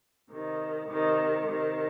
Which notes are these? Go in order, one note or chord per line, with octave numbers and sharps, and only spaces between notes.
C3 D#3
C3 D#3
C3 D#3